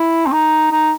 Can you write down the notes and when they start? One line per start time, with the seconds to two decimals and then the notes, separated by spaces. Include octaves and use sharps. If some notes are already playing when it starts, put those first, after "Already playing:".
Already playing: E4
0.26 C4
0.32 D#4
0.71 D#4